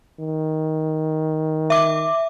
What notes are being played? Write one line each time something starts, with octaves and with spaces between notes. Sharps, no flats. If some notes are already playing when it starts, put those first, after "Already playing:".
D#3
E5 D6